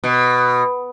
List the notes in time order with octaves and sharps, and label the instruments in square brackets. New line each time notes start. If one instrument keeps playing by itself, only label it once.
[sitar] B2